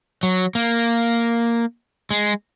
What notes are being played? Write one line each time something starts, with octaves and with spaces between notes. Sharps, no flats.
F#3
A#3
G#3